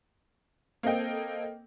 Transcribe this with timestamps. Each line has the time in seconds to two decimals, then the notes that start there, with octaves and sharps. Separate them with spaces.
0.83 A#3 C4 A4 D#5 G5